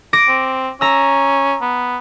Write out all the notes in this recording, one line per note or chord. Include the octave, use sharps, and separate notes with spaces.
D6 A#6 D7
C4
C#4 A#5 E6
B3